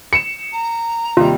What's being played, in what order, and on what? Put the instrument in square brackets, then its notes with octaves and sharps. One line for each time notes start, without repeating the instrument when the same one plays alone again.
[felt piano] C#7 E7
[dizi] A#5
[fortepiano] D#2 C3 G3 [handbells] F4